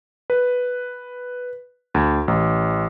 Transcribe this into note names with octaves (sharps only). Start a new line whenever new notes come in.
B4
D2
A1